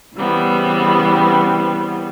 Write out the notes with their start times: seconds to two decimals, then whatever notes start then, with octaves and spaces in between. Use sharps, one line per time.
0.15 C#3 E3 G3 B3 C4